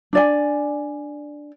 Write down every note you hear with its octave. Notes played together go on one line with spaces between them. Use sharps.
D4 D5 G#5